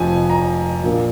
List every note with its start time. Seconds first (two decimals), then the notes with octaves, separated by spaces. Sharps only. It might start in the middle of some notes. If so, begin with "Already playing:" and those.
Already playing: F1 F2 F3 G#5
0.30 A#5
0.82 A#1 A#2 A#3